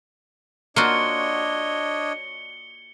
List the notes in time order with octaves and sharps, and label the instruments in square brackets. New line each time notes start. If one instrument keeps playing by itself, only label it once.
[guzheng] A#3 F4 F#4 [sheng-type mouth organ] D4 C#5 D#5 [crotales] C#7 G7